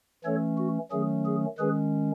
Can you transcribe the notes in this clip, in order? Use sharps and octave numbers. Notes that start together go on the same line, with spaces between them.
E3 A3 C#4 A4 C#5
F#4
D#3 F#3 A3 C#4 G#4
G#4
D#3 G#3 C#4 G#4 B4